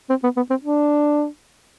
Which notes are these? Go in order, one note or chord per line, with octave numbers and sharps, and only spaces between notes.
C4
B3
B3
C4
D4